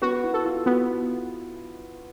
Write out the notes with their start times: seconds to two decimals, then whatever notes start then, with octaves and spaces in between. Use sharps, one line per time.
0.02 B3 F#4
0.24 E4
0.34 A4
0.45 F4
0.66 B3 F#4